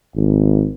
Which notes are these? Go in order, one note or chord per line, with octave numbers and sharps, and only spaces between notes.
G#1